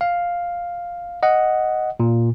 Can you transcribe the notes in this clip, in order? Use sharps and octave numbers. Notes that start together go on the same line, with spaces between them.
F5
D#5 F#5
A#2